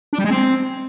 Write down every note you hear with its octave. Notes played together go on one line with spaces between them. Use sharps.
D4
G3
G#3
C4